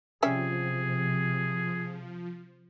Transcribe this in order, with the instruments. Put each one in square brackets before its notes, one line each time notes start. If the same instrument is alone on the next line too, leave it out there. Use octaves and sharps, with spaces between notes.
[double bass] C3 [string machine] F3 [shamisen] G3 C#4 E5 [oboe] G#4